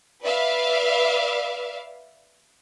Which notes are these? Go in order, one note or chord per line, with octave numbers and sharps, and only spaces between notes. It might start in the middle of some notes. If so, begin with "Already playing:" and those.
B4 D5 E5 F5